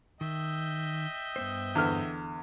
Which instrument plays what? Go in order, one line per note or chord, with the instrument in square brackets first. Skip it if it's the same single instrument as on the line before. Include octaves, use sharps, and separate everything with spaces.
[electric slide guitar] D#3 [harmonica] D#5 E5 G5
[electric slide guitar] G2 B3 C5
[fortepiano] E2 D3 F6